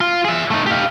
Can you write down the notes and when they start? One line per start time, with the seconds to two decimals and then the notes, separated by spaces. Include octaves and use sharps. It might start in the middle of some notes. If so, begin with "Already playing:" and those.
0.01 F4
0.25 G#4 E5
0.51 A3 D#4
0.66 G4 F5